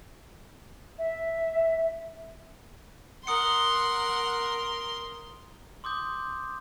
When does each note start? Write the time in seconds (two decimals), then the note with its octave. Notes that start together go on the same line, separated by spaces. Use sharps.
0.99 E5
3.27 A#4 F#5 C6 D#6 C#7
5.84 C6 D6 D#6 G6